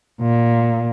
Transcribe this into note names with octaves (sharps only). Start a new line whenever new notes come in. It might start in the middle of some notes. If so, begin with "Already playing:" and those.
A#2